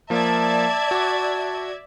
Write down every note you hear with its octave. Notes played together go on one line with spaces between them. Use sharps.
F3 A#3 D5 E5 A5 G#6
F#4 D6